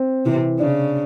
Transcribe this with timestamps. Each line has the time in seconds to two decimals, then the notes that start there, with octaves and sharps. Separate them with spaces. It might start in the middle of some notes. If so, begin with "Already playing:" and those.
Already playing: C4
0.25 C3 E3
0.59 C#3 D4